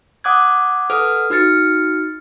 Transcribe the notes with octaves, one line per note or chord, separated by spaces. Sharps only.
F#5 D6 D#6 F#6 G#6
A4 B4 F#5 D#6 F6
D#4 F#4 F6 A6 C#7